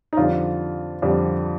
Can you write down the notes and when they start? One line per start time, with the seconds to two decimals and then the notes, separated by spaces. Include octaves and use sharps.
0.13 D#4
0.17 F2 D3 G3 D4 F4
1.02 F2 D3 G3 D4